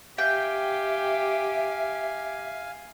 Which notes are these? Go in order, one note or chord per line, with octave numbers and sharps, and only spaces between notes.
G4 E5 F5 G5 G#5